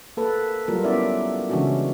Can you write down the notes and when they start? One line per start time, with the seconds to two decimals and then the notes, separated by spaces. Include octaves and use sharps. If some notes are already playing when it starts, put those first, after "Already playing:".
0.17 A#3 A4 B4
0.68 F#3 G3 A#3 F4 A#4
0.84 B3 C#4 E4 D5 E5
1.50 C#3 E3 G#3 C#4 D4 F#4